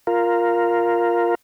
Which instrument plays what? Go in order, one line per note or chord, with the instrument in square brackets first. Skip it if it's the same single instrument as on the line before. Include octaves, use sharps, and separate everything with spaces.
[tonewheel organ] F4 A#4